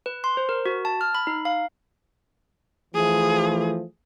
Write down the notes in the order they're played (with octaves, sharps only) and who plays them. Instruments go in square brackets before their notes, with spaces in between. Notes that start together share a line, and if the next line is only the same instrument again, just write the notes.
[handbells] B4
C6
C5
A#4
F#4
A5
F6
B5
D#4
F5
[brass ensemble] E3 F3 A3 [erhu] G#4